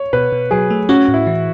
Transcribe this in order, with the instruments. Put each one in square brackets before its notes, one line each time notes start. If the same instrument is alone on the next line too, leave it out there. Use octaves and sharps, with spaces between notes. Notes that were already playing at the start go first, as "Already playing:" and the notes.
Already playing: [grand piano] C#5
[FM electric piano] B2 [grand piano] B4
[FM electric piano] B2
[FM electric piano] F#3 [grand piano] G#4
[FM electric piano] A3
[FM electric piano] C#4 [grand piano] F#4
[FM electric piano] A2
[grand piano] E4
[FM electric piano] E3